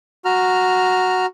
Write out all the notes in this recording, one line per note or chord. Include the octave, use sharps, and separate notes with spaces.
F#4 A#5 F6